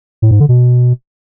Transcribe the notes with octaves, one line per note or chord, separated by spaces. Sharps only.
A2
G#2
D3
B2